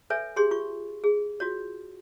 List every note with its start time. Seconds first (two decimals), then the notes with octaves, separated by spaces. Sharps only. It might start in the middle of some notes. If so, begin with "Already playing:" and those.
0.10 A4 B4 C#5 E5 G#5
0.36 G4 G#4 C#5 C6
0.51 F4 C#6
1.04 G#4
1.40 F4 F#4 C#5